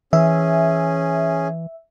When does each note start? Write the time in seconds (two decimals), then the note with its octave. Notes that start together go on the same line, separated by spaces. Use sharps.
0.13 E3 C#4 G#4 E5